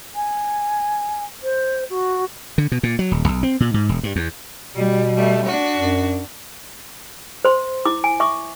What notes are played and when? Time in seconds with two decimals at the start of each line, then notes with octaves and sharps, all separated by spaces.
0.15 G#5
1.42 C5
1.89 F#4
2.58 D3
2.72 B2
2.83 A#2
2.99 F#3
3.11 D#1
3.28 B1
3.43 C4
3.60 A#2
3.74 G#2
3.89 E1
4.03 G2
4.16 E2
4.75 B2 G3
5.15 G3 A3
5.46 D4 F#4
5.77 F#2
7.45 C5 C6
7.85 E4 D6
8.04 G#5
8.20 E5 C#6 D6